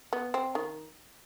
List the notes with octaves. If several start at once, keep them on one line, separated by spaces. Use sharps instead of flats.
B3
C4
D#3